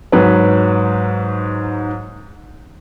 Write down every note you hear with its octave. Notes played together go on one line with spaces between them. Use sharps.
G#2 F#3 B4